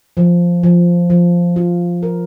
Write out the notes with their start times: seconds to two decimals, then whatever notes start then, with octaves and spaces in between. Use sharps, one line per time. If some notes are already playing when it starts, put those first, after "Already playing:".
0.17 F3
0.63 F3
1.10 F3
1.56 F4
2.03 A#4